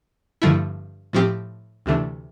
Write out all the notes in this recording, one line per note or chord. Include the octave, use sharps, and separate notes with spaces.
G2 D3 F3 A3 E4
A2 F3 C4 G4
D2 C3 E3 A3 D4